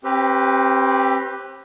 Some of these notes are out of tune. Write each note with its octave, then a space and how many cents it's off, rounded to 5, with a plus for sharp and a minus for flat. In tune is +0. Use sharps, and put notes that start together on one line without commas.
C4 +35 G4 +0 B4 +5